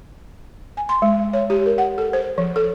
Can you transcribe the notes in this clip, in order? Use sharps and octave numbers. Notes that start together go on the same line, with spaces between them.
G#5
C6
G#3
C#5
G4
A#4
F#5
A4
C5
F3
A4